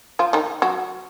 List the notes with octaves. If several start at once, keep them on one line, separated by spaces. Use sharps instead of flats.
F3 F4
D#3 D#4
F#3 F#4